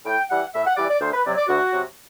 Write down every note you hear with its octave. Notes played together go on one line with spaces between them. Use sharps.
A2 G5
E3 G3 F#5
A2 E5
F#5
E3 G3 D5
D5
D2 C5
B4
C3 F#3 D5
D5
D2 F#4
C3 F#3